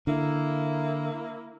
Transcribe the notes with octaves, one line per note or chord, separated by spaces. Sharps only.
D3 A#3 E4